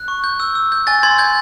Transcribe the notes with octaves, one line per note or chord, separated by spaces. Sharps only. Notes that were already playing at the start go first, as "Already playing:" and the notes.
Already playing: F#6
C#6
G6
E6
E6
G6
G#5 A6
C6 G#6
G6 G#6